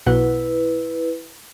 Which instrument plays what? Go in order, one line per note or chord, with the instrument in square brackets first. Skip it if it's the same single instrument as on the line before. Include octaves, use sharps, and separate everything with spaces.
[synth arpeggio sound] B1 B2 F#5 [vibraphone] E4 B4